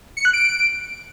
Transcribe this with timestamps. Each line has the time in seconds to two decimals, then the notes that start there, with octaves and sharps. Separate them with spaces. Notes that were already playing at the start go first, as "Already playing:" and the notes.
0.17 C#7
0.25 F#6
0.33 D7